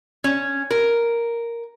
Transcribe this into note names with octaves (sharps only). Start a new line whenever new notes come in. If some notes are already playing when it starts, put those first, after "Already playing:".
C#4
A#4